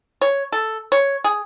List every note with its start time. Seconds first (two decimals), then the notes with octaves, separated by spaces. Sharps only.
0.21 C#5
0.52 A4
0.92 C#5
1.24 G#4